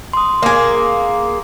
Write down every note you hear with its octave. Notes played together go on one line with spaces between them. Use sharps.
C6 D#6
A#3 G#4